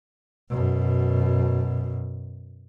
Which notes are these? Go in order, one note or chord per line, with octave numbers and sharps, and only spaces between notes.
F#2 B2